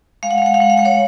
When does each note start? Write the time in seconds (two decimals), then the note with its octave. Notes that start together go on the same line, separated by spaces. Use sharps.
0.23 G#3 F5
0.31 F#5
0.38 F5
0.42 G#3 F#5
0.54 F5
0.60 G#3 F#5
0.70 F5
0.78 G#3 F#5
0.85 C#5 F5